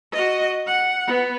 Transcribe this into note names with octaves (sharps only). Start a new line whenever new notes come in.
F#4 D#5
F#5
B3